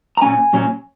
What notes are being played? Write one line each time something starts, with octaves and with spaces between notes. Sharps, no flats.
A#5
A#2 F#3 C#4 G#5
A#2 F#3 C#4